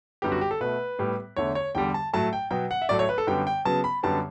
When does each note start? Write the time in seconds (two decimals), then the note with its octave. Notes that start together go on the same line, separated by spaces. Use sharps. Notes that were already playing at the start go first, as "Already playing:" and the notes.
0.22 F#2 D3 G3 B3 G4
0.32 F#4
0.41 G4
0.51 A4
0.60 B2 A3 B4
0.99 A2 G3 B3
1.36 E2 D3 A3 C#5
1.55 C#5
1.75 E2 D3 G3 G5
1.94 A5
2.13 A2 F#3 A3 A5
2.33 G5
2.51 B2 F#3 B3 G5
2.71 F#5
2.82 E5
2.89 A2 F#3 A3 D5
2.99 C#5
3.09 B4
3.18 A4
3.27 F#2 D3 G3 B3 G5
3.47 G5
3.65 C#3 F#3 B3 A5
3.84 B5
4.03 F#2 D3 G3 B3 A5